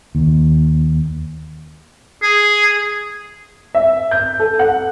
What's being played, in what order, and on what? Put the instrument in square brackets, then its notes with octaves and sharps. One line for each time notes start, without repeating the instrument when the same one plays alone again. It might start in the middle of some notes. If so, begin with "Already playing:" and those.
[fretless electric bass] D#2
[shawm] G#4
[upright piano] E5
G6
A4
F#5